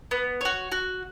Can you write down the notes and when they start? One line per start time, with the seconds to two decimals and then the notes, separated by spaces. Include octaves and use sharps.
0.11 B3
0.41 F#4 C#5
0.72 F#4